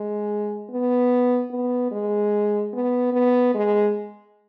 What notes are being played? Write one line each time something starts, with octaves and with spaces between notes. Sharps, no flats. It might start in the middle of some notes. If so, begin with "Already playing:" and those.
Already playing: G#3
B3
B3
G#3
B3
B3
G#3